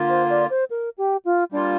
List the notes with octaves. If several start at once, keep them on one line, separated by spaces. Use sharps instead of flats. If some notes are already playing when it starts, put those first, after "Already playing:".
Already playing: D3 A#3 F4
C5
D5
C5
A#4
G4
F4
G3 A#3 D4 F4